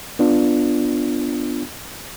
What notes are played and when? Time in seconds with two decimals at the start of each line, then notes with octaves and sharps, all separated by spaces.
0.19 B3 D4 F4